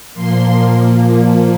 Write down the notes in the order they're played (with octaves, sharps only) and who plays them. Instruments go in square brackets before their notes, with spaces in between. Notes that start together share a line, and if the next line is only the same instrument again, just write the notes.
[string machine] A#2 F3 A#3 C6